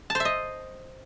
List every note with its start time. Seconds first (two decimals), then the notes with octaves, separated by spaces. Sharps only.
0.10 A5
0.15 C5
0.20 E5
0.25 D#5